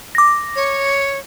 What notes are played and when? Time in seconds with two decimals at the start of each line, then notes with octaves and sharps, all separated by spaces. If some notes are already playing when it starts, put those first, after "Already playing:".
0.15 D6 A#6
0.56 C#5